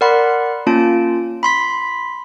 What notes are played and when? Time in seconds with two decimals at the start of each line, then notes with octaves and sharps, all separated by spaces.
0.01 A#4 D5 F#5 B5 C6
0.67 A#3 C#4 F4 A5 D7
1.43 B5 C6 B6